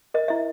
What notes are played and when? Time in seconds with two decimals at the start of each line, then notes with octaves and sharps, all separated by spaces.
0.14 A#4 D#5
0.28 E4 E5